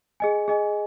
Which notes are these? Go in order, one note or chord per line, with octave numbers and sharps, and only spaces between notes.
G#4 D#5 G#5
G#4 D#5 G#5